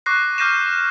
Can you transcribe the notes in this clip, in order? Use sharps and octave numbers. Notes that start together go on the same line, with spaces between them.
C#6 D6 F#6 A#6 C7
D6 F6 G6 A#6 D#7 E7